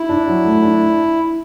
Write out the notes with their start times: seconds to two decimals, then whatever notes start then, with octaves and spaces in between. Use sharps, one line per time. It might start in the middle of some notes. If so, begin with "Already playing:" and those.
Already playing: E4
0.09 D4
0.27 F#3
0.45 A3
0.62 D4
0.81 D4